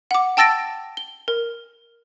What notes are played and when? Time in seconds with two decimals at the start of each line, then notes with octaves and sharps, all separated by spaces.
0.11 F#5 D6
0.37 G5 A5 E6 A6 A#6 D7
0.97 G7
1.28 A#4